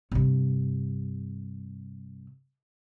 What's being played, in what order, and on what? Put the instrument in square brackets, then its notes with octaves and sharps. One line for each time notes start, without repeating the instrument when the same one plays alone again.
[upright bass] G2 C3